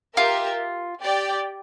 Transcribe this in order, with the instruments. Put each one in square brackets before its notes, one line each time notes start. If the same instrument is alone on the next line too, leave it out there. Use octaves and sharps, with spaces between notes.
[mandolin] F4 [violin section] G4 A#4 E5
[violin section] G4 D5 G5